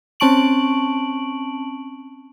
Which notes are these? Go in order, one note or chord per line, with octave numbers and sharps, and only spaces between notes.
C4 C#4 A5 C#6 D7 F#7